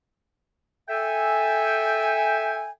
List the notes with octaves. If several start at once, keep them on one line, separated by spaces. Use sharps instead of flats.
A4 E5 G5 G#5